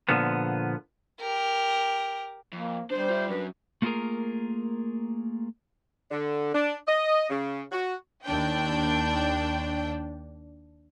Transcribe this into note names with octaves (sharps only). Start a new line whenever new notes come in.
A#2 D3 F3 B3
G4 A#4
F2 A#3
G3 B3 D4 C5
F4 E5
F#2 F#3 D4 A#4 B4
A3 A#3 F4 F#4 G#4 A#4
D3
D4
D#5
C#3
F#4
D#2 D4 G5